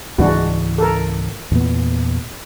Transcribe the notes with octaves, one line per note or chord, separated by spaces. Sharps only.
C#2 G#2 E3 G#3 D4 F#4
A4 A#4
E2 A#2 B3